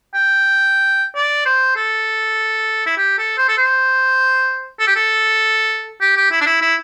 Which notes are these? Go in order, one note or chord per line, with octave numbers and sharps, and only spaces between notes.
G5
D5
C5
A4
E4
G4
A4
C5
A4
C5
A4
G4
A4
G4
G4
E4
D4
E4
E4